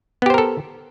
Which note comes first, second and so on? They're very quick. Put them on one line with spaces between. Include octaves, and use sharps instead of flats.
B3 G4 C5 A#4 A4